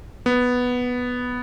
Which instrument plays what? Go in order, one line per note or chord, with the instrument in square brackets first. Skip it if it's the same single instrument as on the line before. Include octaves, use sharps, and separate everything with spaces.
[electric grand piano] B3